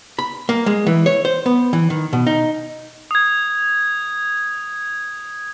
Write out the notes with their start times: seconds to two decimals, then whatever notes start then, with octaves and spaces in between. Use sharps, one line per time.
0.19 B5
0.49 A#3
0.66 G#3
0.87 E3
1.06 C#5
1.25 C5
1.46 B3
1.73 E3
1.90 D#3
2.13 B2
2.27 D#4
3.11 D#6 G#6